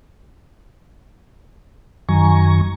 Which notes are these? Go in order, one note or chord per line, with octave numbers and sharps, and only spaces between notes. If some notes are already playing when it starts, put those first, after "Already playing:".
F#2 D#3 F#3 G#5 A#5 C#6